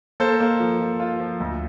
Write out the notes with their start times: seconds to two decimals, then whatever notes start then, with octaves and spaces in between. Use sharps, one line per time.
0.20 A#3 A4 C5
0.40 A#3
0.60 F3
0.80 F3
1.00 F4
1.20 F3
1.40 D2